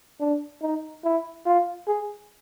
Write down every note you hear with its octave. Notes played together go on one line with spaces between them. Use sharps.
D4
D#4
E4
F4
G#4